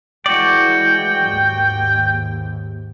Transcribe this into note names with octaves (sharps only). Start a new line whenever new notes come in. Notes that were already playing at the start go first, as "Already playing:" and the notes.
E3 G#3 F#4 D5 G5
D#2 G#2